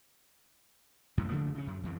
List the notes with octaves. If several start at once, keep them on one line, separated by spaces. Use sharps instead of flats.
F#2 A2 C3
C#3 F3 A3 A#3
C#3 C#4
F#2
F2 E3